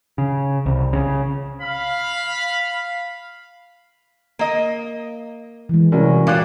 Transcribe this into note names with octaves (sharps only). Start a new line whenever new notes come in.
C#3
C2
C#3
F5 B5
A#3 D#5
E3 G#3
C2 C#4 F#4 A#4
A#2 G3 F5 D6 F#6